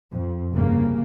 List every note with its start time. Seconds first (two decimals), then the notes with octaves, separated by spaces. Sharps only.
0.11 F2
0.52 F1 C2 G2 C#3 A#3